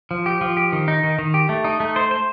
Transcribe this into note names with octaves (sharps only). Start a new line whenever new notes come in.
F3
G4
F3
G4
D#3
D#4
D#3
D#3
G4
A3
D#4
A3
C5
C5